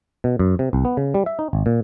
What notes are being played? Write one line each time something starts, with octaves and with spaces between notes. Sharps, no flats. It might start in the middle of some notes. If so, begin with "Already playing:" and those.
B2
F#2
C3
C2
B3
C#3
G3
E5
D#4
G#1
A#2